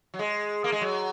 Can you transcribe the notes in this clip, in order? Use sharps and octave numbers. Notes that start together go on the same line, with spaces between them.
F#3
G#3
A#3
G#3
F#3